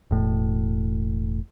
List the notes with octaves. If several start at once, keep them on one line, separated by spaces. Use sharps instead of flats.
E1 A2